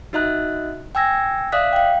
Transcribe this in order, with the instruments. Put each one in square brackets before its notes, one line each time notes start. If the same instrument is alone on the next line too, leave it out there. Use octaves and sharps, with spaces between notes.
[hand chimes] D#4 F#4 D#5 E5 A#5 F#6
G5 G#5 E6 G#6 A#6
D5 E5 F5 D#6 F#6 B6
F5 G5